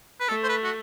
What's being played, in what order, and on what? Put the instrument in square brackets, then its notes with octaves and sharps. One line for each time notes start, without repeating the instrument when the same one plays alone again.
[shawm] B4
[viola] A3 [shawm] A4
[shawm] C5
B4
F#4